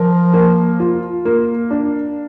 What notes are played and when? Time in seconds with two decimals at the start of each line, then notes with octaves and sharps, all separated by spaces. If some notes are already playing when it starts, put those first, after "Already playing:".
Already playing: F3 A#4
0.33 A#3
0.80 F4
1.25 A#3
1.71 D4